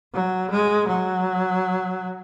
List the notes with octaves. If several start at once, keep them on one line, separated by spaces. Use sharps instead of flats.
F#3
G#3
F#3